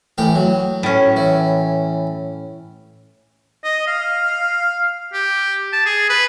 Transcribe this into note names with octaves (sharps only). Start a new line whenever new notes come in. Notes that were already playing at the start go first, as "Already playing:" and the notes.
A2 E3 G4
F#3
A2 C#4
E3
D#5
F5
G4
A5
G#4
B4